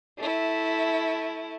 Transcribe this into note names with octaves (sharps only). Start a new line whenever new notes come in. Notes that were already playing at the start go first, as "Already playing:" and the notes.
A3 E4